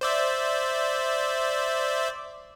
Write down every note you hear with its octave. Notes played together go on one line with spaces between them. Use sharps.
C5 D5 E5